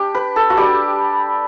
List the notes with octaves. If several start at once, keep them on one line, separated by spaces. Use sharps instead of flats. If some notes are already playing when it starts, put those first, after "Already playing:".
Already playing: D4 G4
B4
A4
F#4
G3 D4 G4